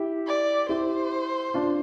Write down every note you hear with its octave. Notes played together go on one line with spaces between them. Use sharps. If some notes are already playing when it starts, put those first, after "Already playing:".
Already playing: E4 G4
D5
E4 G4 C5
D4 F4